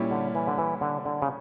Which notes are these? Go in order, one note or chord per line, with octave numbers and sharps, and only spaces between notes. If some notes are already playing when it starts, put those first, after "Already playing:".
Already playing: A#2 G3 C#4 E4 G4
D3
E3
D3
E3
D3
D3
C#3